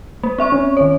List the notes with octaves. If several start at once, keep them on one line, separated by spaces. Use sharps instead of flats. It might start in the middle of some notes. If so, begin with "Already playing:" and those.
A#3
C4 E5 C#6
C#4
D#3 C#5